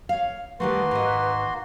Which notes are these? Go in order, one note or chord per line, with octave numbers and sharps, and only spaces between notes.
C#5 F5
D#3 G3 A3 A#3 F#4 B4 C6
G#2 D#3 D#5